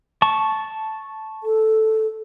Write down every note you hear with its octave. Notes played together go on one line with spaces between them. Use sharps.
A5 C#6
A4